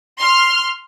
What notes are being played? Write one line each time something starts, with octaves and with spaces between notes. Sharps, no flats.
C6 F6